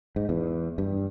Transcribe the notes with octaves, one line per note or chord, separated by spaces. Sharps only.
G#2
E2
G2